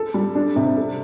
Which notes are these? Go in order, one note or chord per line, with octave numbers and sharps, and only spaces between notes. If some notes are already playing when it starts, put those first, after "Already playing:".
Already playing: A4
G3
D4
C3
A4